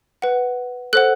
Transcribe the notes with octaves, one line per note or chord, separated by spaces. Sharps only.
B4 F#5
A4 C5 F#5 F#6